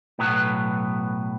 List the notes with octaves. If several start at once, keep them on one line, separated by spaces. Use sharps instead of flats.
B1 A2 F#3 B3